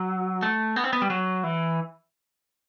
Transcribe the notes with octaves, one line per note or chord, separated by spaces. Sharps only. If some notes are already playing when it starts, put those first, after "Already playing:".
Already playing: F#3
A3
B3
C4
B3
G3
F#3
E3